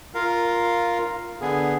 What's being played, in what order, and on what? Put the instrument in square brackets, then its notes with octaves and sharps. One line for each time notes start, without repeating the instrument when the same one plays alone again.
[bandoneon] F4 A#4 F5
D3 B3 G#4